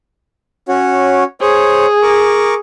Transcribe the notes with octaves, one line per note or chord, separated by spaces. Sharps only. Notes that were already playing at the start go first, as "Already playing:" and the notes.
C#4 F#4 C#5
G#4 C5 C#5
A#4 C#6 D6